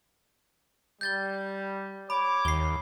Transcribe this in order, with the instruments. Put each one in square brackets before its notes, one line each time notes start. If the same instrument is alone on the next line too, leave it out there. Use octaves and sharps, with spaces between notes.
[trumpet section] G3 [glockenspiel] G6 A6 G7
[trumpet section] C#5 D6 [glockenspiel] B5
[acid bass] D#2 [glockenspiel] C7 G7